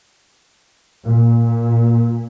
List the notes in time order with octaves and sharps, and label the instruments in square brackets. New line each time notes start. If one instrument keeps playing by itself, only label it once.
[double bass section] A#2